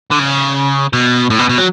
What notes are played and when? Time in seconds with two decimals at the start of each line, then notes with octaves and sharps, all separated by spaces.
0.11 D3
0.19 C#3
0.93 B2
1.30 A2
1.39 B2
1.49 B2
1.58 F#3